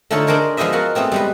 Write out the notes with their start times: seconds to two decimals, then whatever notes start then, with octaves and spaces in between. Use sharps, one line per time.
0.10 D3 A3 D#4 F4 A4 C#5
0.27 D4 G#4 A#4 C5 C#5
0.57 F3 G#3 B3 C5 D#5 E5
0.72 F4 F#4 A#4 F#5
0.95 A3 B3 C4 G#4
1.12 G3 G#3 B4